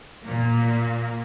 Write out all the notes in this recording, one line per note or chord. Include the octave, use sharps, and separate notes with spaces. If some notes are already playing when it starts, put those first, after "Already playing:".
A#2 A#3